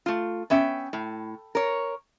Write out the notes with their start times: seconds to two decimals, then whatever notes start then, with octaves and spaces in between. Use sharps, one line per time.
0.06 A3 F4
0.50 B3 C#4 E5 G5
0.93 A2
1.55 A#4 C#5